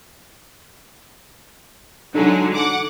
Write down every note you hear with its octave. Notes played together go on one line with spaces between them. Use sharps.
D3 F#3 G#3 D4 D#4 A4
F#5 D6